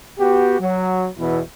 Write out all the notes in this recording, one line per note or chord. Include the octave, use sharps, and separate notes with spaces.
B3 F#4 G4
F#3
E2 B2 E3 E4